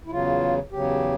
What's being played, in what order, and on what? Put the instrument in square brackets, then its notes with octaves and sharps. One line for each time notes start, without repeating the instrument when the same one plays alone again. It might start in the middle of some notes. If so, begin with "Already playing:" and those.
[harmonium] E4
E2 C#3 F#3 F4
E2 C#3 F#3 G4